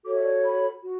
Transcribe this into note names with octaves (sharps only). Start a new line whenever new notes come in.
F#4 A4 C#5 D6
E5
D5
B5
F#4